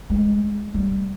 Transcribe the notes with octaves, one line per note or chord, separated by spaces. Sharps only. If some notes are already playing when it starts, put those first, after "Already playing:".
G#3
G3